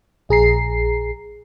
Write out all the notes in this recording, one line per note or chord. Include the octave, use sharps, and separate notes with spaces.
A#1 G#4 A#5 C7